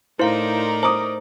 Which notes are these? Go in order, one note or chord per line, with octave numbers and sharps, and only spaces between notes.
A2 D#4 E4 A#4 C5 D5 F5
C5 A#5 D6 D#6